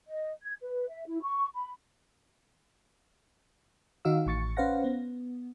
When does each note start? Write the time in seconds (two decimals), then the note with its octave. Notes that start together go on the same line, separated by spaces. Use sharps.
0.07 D#5
0.43 G#6
0.61 B4
0.89 E5
1.07 E4
1.22 C#6
1.54 B5
4.05 D#3 D#4 F#4 F5 E6
4.26 A1 A2 C#6 A6 C#7
4.57 C#4 B4 C5 F5 F#5 A#6
4.84 B3